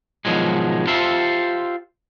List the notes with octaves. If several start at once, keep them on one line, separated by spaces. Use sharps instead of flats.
G#2 B2 D#3 F3 F#3 G#3
F4 G4 A4 C5 E5